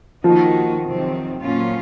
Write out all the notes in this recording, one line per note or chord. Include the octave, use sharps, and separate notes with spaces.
D#3 F3 A#3 D#4 F#4
F2 C3 D#3 F#3 C4
A#2 F#3 C#4 F4